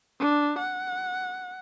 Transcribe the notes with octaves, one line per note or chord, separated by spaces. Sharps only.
D4
F#5